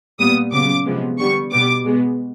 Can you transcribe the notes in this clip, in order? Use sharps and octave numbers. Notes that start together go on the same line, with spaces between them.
A#2 G3 B3 D#6
C#3 F#3 B3 D6
C3 F3 G#3 B3
D3 G3 B3 C#6
B2 G3 B3 D6
B2 G#3 B3